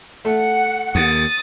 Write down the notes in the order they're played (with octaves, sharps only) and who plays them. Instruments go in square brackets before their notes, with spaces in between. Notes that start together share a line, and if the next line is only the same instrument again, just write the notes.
[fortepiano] A3 [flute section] F#5
[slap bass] D#2 [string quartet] D#6 A6